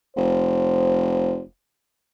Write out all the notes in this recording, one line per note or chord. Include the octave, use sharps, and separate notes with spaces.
F1 C5